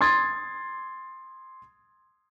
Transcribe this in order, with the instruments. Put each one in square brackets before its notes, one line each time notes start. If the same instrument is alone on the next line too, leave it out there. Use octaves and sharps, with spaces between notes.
[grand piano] C6 D#6 G#6 A6